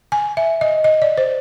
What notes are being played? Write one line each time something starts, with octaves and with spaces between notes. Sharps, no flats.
G#5
E5
D#5
D#5
D5
C5